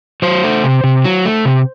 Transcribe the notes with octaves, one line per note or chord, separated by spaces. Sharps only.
F#3 C5
A3
C3
C3
F#3
A3
C3